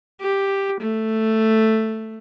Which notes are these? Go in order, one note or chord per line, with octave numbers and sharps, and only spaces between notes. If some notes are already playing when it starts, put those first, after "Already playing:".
G4
A3